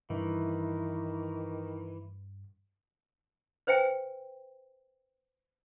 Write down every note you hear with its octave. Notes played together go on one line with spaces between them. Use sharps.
G2 D#3 E3
B4 C5 E5 G5 G#5